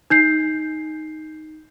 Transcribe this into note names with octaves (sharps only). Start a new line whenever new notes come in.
D#4 G6 C7